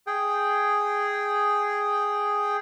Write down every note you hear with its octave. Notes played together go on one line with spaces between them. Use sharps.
G#4 G5